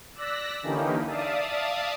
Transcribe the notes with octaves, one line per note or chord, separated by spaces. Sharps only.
D5 E6 F#6 A#6 B6
D3 E3 A#3 C#4 D#4 G4
D5 E5 F5 A5 D#6